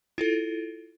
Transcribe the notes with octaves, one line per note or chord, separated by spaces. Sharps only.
E4 F4 A4